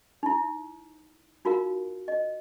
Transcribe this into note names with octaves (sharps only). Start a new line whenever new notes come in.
D#4 E4
D#4 F4 F#4 A#4 F5
D#5